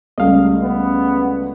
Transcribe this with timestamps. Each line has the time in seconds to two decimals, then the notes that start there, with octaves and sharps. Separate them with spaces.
0.18 C#2 G3 A3 D#5 F5
0.62 B3